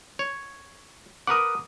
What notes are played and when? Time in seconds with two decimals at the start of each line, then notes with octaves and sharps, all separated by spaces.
0.19 C#5
1.27 A#4 B4 F#5 D6 D#6